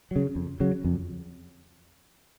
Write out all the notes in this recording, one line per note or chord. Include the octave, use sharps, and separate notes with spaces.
C#3 F#3
F2
C#3 F#3
F2